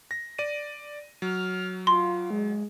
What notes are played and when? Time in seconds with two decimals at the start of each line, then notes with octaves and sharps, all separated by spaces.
0.11 A#6
0.39 D5 D#7
1.22 F#3 F6
1.87 F4 C6
2.31 G#3